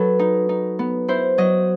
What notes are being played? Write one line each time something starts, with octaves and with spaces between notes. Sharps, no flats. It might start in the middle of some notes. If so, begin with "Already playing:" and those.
Already playing: F#3 A4 B4
D#4
D#4
B3
E4 C5
F#3 D#5